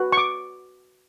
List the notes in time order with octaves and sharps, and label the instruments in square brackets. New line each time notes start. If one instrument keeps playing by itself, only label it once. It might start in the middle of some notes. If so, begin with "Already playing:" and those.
Already playing: [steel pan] F#4 B4
C#6
D6